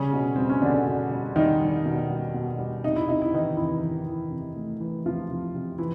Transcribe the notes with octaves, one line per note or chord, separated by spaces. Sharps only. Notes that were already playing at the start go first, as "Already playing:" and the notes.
Already playing: C#3 G3 C#4
B2
G3 C4
C#4
B2 D3 D4
B2
G3
D#3 G3 D#4
G3
B2
G3
B2
G3
C3 D#4
E4
C3 D#4
E4
D#3 E3 D#4
C3 E3 E4
E3
E3
C3
A3
E3
C3 F3 F4
C3
C3
E3 F3 E4